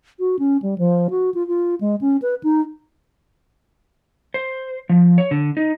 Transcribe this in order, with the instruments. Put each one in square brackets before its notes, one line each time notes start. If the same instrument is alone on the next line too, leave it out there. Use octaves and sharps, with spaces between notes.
[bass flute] F#4
C#4
G3
F3
F#4
F4
F4
G#3
C#4
B4
D#4
[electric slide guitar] C5
F3
C#5
D3
D#4